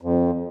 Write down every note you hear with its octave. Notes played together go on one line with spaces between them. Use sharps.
F2